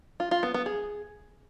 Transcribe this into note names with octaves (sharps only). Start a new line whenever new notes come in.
F4
F4
B3
B3
G#4